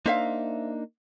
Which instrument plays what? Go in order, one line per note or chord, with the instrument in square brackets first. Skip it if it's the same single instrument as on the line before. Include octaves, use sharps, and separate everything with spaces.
[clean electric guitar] A#3 D4 D#4 [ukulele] C5 E5 F5